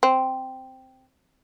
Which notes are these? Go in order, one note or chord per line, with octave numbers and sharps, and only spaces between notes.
C4